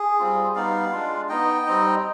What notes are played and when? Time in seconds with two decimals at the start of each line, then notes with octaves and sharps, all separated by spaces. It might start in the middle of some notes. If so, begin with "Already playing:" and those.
Already playing: G#4
0.19 G3 C4 F4
0.55 G3 B3 D#4 D5 F5
0.92 G#3 D4 F4
1.29 B3 D#4 D#5 G5
1.66 G3 C4 D#4